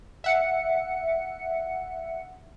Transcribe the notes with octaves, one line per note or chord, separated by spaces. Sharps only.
E5 F#5 C#7